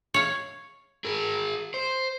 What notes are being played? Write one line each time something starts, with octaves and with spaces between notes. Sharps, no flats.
C#5 F5
G#4 A#4
C5